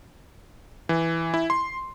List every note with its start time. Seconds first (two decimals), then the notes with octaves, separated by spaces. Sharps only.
0.89 E3
1.34 E4
1.50 C6